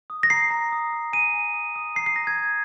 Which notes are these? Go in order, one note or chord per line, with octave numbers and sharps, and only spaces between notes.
D#6
A#6
A#5 C7
A#5
D#6
D#6
G#5 D#7
G#5
D#6
D#6
A#5 C7
C7
A#5 A#6
G#6
D#6